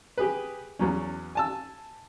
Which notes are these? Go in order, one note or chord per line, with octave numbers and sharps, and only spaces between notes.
G4 G#4 B4
E2 F#3 C#4
G#5 A5 E6